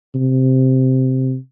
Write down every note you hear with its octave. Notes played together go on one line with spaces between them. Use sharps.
C3